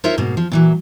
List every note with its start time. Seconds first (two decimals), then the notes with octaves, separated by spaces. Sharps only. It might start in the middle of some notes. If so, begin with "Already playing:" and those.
0.04 D#4 F4 A#4 C5 C#5 E5
0.18 G#2 B2 A#3
0.37 F3
0.52 A#2 E3 F#3